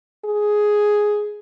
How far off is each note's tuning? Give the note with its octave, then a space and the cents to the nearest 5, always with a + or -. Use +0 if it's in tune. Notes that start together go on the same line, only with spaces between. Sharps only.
G#4 +5